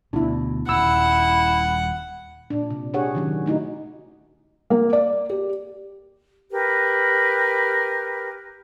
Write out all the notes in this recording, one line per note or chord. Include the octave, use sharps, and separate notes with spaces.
D2 B2 D4 E4
D#1 E4 F#5 E6
A#2 D4
C3
D4 G4 G#4 C#5 F#5
D#3 F#3 C#4
A3 D#4 E4 F#4
A#3
D5
G4
G4 A#4 B4